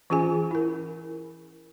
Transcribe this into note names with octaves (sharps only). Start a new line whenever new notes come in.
E3 C#4 F4 G#4 G#5
E4 A#4